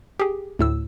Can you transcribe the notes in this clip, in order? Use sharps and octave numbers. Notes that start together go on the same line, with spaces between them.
G4 G#4
D2 A2 E6